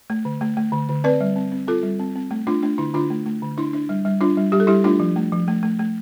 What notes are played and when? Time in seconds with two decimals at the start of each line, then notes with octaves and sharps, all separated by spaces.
0.10 A3
0.25 D3
0.41 A3
0.57 A3
0.73 D3
0.89 D3
1.04 C4 B4 D5
1.21 G3
1.36 C4
1.52 C4
1.67 C4 F4 A4
1.83 G3
1.99 C4
2.16 C4
2.31 A3
2.47 A3 D4 F4
2.62 A3 D4
2.78 D3 E4
2.94 D3 D4 F4
3.10 A3
3.26 A3
3.42 D3
3.57 D4 E4
3.73 D4
3.89 G3
4.05 G3
4.21 D4 F4
4.37 G3
4.52 G3 G4
4.60 A4
4.67 G3 E4 G4
4.84 A3 D4 F4
5.00 F3
5.16 A3
5.32 F3
5.48 A3
5.63 A3
5.79 A3